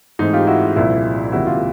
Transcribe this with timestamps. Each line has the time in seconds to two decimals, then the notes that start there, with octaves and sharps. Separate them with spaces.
0.19 G#2 E3 A3 C4 D#4
0.33 F4 G4
0.47 E4 F#4
0.76 C2 A#2 F3 E4
1.32 C#2 C3 D#3 F#3 A#3 E4 F#4
1.47 F4 G4